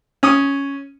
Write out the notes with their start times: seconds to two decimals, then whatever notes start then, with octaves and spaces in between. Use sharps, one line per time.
0.23 C#4 D#6